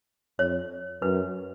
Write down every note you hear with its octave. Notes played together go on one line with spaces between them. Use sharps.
F2 C#5
F#2 B4